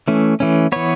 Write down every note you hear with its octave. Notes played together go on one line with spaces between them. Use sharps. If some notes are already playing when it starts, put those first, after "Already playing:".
E3 A3 C#4
E3 A3 C#4
E3 B3 C#5